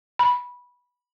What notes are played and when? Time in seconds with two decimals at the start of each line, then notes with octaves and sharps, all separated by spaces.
0.19 B5